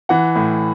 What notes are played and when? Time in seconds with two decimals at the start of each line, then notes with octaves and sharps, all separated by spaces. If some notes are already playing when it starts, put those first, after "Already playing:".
0.09 E3 F#5
0.35 A2